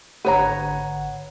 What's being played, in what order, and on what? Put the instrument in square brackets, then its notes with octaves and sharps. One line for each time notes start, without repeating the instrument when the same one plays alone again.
[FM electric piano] G#1 D3 F#5 [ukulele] B4 C#5 A#5